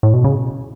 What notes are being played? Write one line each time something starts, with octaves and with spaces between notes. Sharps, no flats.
A2
B2
C#3